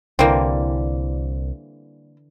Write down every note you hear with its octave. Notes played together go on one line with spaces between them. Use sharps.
C2 D3 E3 G3 A#3 C4